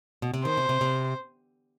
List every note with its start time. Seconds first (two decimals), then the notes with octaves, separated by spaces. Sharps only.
0.22 B2
0.34 C3
0.45 D#3 C5
0.57 C3
0.69 C3
0.81 C3